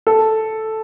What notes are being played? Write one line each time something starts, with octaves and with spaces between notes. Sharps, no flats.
A4